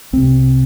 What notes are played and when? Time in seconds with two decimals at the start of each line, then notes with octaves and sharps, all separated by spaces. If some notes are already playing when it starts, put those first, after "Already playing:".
0.13 C2 C3 C4